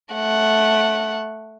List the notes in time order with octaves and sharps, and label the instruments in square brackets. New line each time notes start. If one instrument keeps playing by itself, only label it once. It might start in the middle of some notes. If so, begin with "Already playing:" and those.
[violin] A3 F#5